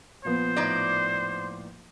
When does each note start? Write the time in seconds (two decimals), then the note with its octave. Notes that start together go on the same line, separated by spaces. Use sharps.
0.25 A#2 F3 B3 C5
0.56 A2 D#4 D5